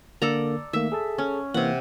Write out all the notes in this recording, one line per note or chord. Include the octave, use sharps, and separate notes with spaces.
D3 A#3 A4 A#4 D5 A#5
D#3 A3 A#3 E5
G#4 A4 A5
C#4
C3 E3 A#3 F#5